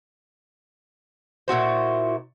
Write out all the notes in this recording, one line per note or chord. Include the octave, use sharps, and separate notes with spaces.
A#2 E4 F#4 C5